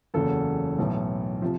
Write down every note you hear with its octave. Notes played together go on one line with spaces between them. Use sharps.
F#1 E2 C#3 F#3 A4
B1 A2 E3
C3 F3